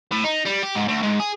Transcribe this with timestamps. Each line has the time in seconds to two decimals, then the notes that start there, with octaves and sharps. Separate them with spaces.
0.12 A2
0.25 D#4
0.46 G3
0.63 G4
0.75 G#2
0.88 D2
1.03 G#2
1.20 G#4